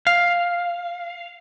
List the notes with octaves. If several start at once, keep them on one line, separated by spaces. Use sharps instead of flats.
F5